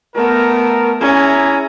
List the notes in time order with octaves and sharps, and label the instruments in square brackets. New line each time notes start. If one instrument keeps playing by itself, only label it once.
[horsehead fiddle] A3 B3 [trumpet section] A#4
[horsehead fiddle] C#4 [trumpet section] E4 G#4 A#5